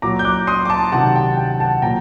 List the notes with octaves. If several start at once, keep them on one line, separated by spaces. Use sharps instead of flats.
A#2 F#3 A#5 D6
G6
D6 F#6
C6 D#6
D6
A5 C6
C3 D#3 F#3 F#5 A5
G5
G5
F#5 A5
A#2 F#3 G5 A#5